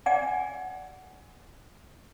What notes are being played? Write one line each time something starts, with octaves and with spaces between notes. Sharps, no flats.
D5 F#5 G#5